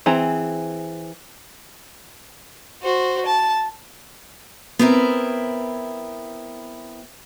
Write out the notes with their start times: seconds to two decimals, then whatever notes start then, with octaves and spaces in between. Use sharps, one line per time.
0.06 E3 C4 G#4 A#5
2.83 F#4 C5
3.26 A5
4.79 B3 C4 E4 A#4